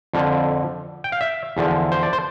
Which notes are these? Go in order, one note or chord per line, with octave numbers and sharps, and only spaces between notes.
F2 D3 F3
G5
F5
E5
E2 D3 F3
C5
D5
C5